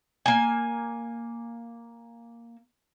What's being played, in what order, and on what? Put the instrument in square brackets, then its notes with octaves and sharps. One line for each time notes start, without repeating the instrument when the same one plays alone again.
[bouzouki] A#3 G#5